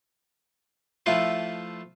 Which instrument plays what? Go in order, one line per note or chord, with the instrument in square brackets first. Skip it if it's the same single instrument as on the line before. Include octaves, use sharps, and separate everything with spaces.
[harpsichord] F3 A3 E4 F4 B4